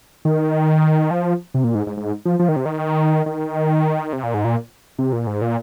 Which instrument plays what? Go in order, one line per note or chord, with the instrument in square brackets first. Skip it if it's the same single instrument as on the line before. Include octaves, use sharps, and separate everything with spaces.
[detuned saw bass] D#3
F3
C3
A#2
G#2
G#2
G#2
F3
F3
D#3
C3
D#3
D#3
C3
A#2
G#2
A#2
C3
A#2
G#2
A#2